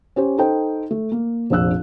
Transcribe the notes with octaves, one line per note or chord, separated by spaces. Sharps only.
C#4 G4 C5
D#4 A4 C5 G5
A3
A#3
F1 A#1 D4 E6 F#6